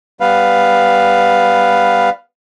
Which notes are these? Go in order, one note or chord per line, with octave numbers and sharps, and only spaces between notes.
G3 B3 B4 F5